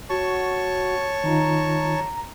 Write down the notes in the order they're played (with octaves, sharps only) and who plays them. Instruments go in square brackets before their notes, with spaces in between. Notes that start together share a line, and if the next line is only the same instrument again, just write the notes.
[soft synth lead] F#4 [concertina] C#5 A5 C#6
[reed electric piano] D#3 D#4 F4 [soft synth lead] A#5